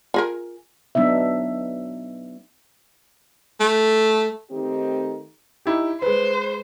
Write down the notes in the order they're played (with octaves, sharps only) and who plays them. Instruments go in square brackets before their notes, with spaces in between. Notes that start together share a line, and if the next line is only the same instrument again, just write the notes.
[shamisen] F4 G#4 A#4
[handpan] F#3 B3 D4 D#4 E5
[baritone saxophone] A3
[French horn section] D#3 A3 C4 D#4 G4
[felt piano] D#4 E4 G4
[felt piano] G#3 B4 [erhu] C5